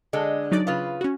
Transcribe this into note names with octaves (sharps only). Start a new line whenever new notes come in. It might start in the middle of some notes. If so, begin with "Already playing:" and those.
D3 G#3
F#3 D#4 D5
C#3 F4 B4
C#4 F#4